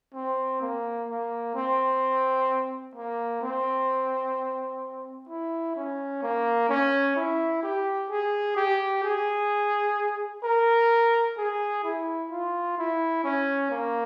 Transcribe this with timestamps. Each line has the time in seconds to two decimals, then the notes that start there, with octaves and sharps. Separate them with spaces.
0.14 C4
0.61 A#3
1.08 A#3
1.55 C4
2.95 A#3
3.42 C4
5.29 E4
5.76 C#4
6.22 A#3
6.69 C#4
7.16 E4
7.63 G4
8.10 G#4
8.56 G4
9.03 G#4
10.44 A#4
11.37 G#4
11.84 E4
12.31 F4
12.78 E4
13.24 C#4
13.71 A#3